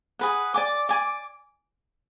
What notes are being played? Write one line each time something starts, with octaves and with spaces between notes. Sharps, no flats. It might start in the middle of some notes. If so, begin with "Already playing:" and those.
G#4 B4 F#5
D5 G#5 D6
D5 G#5 D6